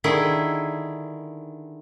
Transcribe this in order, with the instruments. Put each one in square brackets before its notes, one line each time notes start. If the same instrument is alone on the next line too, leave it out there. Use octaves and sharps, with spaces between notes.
[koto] D3 D#3 E4 G#4